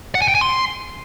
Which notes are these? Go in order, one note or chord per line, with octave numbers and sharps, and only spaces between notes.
F#5
G#5
G5
G#5
C6